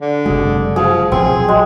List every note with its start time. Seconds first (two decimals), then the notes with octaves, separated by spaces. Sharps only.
0.01 D3
0.26 F#1 C3 G#3 G#4
0.76 F3 G#4
1.12 B1 A#2 F3 C4 G#4
1.48 G#3